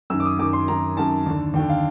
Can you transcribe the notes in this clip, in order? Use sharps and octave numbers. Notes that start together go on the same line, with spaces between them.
F#2 D#3 E6
D6
D#6
F#2 D#3 D6
C6
F#2 D#3 A#5
F#2 D#3 A5
D#2 D3
D#2 D3 G5
F5